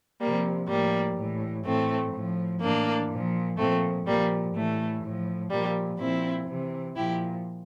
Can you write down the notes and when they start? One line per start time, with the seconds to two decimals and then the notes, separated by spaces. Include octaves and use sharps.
0.20 C3 F3 G3 A#3
0.69 A2 F3 G3 A#3
1.18 A2 E3
1.65 A2 E3 A3 C4
2.14 A2 F3
2.61 A2 E3 A#3 D4
3.10 A#2 F3
3.58 A#2 F3 A3 C4
4.07 A#2 F3 G3 A#3
4.54 A2 E3 A3
5.03 A2 F3
5.51 A#2 F3 G3 A#3
5.99 A#2 F3 C4 E4
6.48 C3 E3
6.96 A#2 F3 E4 G4